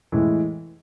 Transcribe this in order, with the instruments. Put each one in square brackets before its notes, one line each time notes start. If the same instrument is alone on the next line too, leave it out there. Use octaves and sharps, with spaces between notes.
[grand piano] A2 E3 G#3